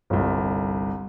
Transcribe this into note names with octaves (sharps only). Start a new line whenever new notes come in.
G1 C2